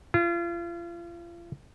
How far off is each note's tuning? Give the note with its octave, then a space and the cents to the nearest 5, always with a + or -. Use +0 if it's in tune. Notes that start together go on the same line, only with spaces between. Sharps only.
F4 -35